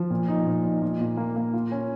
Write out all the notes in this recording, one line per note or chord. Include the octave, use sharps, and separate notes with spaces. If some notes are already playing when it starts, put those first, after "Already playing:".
Already playing: F3
A#2
D#4
A#2
D#4
A#2
A#2
A#3
A#3
F4
C#4